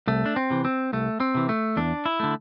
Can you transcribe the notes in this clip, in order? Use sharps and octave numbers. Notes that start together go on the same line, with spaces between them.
C2 A3
D4
C4
C3 E3
C4
C2 A3
C4
C3 E3
A3
E2 D4
E4
D3 A3